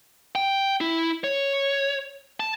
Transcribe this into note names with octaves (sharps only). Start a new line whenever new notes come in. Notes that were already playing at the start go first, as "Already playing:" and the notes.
G5
E4
C#5
A5